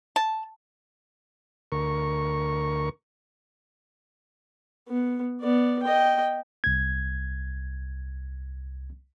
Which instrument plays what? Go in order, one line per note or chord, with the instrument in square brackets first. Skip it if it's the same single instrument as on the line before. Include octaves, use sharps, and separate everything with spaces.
[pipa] A5
[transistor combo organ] D2 A#4 C#6
[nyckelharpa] B3
B3 D5
D#5 G5
[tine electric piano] C2 G#6